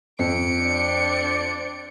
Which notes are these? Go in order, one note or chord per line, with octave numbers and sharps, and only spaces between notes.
F2 C#7 D7
C4 D4